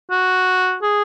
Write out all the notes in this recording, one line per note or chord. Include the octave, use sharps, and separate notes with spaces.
F#4
G#4